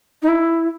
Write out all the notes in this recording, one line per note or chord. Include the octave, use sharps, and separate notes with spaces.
D#4
E4